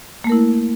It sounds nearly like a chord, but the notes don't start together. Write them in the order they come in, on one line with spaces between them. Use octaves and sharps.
A#3 A3 A#4 E4